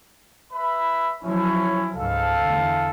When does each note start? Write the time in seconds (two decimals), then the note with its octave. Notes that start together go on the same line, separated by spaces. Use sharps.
0.53 B4 E5 B5
1.23 F3 F#3 C#4 E4
1.94 C#2 G#2 A4 F5
2.42 E2 D3